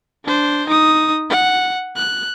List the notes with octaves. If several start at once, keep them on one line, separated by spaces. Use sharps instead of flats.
D4 C5
D#4 D#6
F#5
F#6